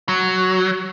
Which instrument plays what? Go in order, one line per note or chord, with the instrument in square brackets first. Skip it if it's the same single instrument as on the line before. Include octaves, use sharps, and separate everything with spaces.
[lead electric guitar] F#3